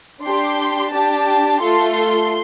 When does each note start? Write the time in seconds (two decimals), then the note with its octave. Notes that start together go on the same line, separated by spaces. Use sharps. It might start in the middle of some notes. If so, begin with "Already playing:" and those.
0.22 D4 G4 C6
0.91 D4 G4 A5
1.61 A3 F4 A4 C6